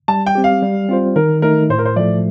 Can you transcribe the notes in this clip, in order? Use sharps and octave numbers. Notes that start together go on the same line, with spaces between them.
G3 A5
G5
C4 G4
F5
G3
C4 F4 C5
D#3 A#4
A3 D#4 A#4
A2 C5
A#4
C5
F3 A3 D5